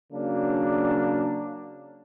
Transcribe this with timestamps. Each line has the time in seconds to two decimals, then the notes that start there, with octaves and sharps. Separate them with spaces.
0.12 C#3 F#3 A#3 D4